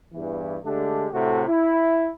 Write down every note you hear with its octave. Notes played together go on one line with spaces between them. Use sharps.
E2 G2 E3
D3 G#3 A3 D4 G4
A2 C3 A3 F#4 A4
E4